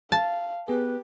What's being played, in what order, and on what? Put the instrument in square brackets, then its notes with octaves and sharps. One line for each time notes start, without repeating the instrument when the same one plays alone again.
[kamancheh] F5 [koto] A5
[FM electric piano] B3 G#4 [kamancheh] G4 [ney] B4